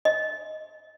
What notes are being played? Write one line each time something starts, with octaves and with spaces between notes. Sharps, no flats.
D#5